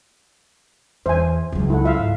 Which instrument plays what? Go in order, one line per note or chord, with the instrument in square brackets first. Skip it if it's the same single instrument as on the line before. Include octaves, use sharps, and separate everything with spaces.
[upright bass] E2 [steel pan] C5 E5 G#5
[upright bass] C#2 F#3
[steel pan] E4 A4 F#5
F4 E5 F5
[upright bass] G#2